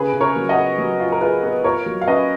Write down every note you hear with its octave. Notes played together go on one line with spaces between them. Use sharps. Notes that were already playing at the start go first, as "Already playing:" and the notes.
Already playing: C#3 G#4 B4
C#3
A#4 C#5
F#3
D#5 F#5
B3
F#3
F4
A#4
F4 G#4 B4
B3
F4 A#4 C#5
F#3
F5
C#4 B4 D#5